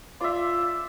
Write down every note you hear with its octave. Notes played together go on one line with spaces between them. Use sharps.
F4 D5 E5